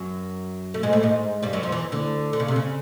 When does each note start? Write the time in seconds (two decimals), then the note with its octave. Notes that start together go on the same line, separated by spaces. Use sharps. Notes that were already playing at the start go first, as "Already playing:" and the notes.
Already playing: F#2 F#3
0.74 A3
0.83 G#2 G#3
0.93 A2 A3
1.03 G#2 G#3
1.43 G2 G3
1.53 F#2 F#3
1.63 F2 F3
1.72 E2 E3
1.92 D2 D3
2.33 D3
2.40 C#3
2.48 C3
2.56 C#3